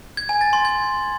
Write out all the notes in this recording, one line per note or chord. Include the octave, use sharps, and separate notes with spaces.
G#6
G#5
A6
C6
G#6